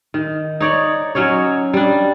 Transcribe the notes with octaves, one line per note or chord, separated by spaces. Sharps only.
D#3
D#4 C#5 D5
F#3 C#4 D#4 C#5
G3 D4